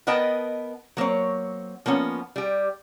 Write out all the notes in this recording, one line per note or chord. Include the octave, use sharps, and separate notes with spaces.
B3 A#4 B4 D#5 G5 A5
F#3 A#3 C4 C#5
F3 A#3 B3 C#4
G3 G4